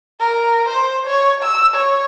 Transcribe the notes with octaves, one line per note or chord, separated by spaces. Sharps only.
A#4
C5
C#5
E6
C#5